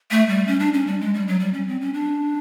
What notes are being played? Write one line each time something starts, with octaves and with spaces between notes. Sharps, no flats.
A3
G3
C#4
D4
C#4
G3
G#3
G3
F#3
G3
C#4
C4
C#4
D4